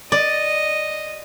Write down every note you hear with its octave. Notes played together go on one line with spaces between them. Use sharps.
D5 D#5